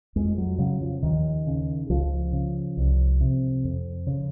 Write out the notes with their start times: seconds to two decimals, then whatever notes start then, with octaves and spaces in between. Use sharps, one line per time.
0.16 F2 G#3
0.38 F#3
0.59 C#3 F#3
0.81 F3
1.02 D#2 D#3
1.47 C#3
1.90 C#2 F3
2.33 C#3
2.77 C2
3.21 C3
3.64 F2
4.07 C#3